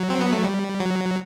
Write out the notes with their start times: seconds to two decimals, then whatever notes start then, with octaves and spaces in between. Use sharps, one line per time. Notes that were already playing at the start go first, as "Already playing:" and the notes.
Already playing: F#3
0.10 C4
0.21 B3
0.33 A3
0.44 G3
0.80 F#3